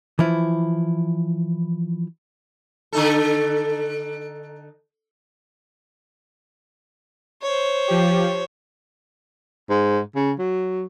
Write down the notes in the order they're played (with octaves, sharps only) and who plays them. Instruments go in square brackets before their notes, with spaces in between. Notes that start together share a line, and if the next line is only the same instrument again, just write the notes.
[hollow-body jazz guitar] E3 F3 E4
[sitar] D3 D#4 A4
[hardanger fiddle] C5 C#5
[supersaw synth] F3 G4
[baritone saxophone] G#2
C#3
F#3